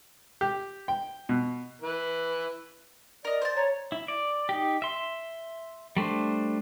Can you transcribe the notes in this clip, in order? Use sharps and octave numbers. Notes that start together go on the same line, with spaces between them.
G4
G5
B2
E3 B4
A#4 D5 D#5
C5 A5
C#5 A#5
E4
D5
D#4 G4
E5 C6
G3 A3 D4 C5